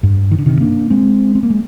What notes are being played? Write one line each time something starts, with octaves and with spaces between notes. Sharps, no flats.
G2
D#3
D3
C3 D#3
A#3 D4
G#3 C4
C4
A#3
G#3